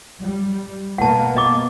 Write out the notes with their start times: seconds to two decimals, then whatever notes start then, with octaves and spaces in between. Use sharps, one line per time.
0.22 G3
0.98 B2 A#3 B3 F#5 A5
1.37 D#5 D6